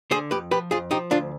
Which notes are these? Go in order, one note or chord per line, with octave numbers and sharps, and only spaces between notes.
D3 G#4 C5
F2 G4 B4
F3 G4 B4
F2 F4 G#4
F3 D#4 G4
D2 D4 F4